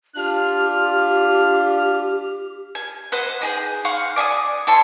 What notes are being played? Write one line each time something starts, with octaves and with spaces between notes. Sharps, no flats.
D4 F4 G4 F6
G#5
B4 C5 D#5 F#5
D#4 G4 G#4
F5 F#5 C6 C#6
D5 G#5 C6 D#6
E4 C#5 A5 C6